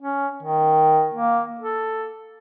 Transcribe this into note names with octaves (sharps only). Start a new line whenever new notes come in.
C#4
D#3
A#3
A4